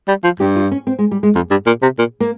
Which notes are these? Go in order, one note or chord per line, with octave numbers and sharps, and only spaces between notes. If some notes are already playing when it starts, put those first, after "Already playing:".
G3
F3
G2 G4
F4
C#4
C4
G#3
G3
G#3
F2
G2
A#2
C3
A#2
A#3